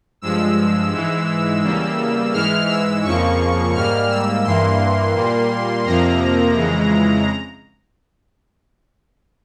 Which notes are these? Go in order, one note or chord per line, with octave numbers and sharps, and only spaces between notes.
G2 F3 G#3 E6
G#2 E3 G#3
E2 C#3 G3 A#3
G#2 E3 G#3 F6
E6
F2 C#3 F3 A#3 C#6
G#2 G3 A#3 F6
E6
G2 E3 A#3 C6
A#2 G3 A#3
F2 C3 F3 A#3 A#5
F2 C#3 E3 G#3